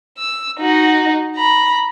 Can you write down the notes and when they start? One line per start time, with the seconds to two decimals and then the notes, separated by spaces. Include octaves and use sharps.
0.18 E6
0.60 D#4 F#4
1.36 A#5 B5